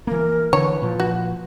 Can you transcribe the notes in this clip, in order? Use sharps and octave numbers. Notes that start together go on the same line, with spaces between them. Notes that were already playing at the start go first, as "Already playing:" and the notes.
E3 A#3 A#4
D3 E3 B4 C#5
A#2 F3
F#4